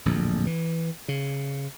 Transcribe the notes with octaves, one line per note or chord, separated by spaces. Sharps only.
D1 A#1 F2
E3
C#3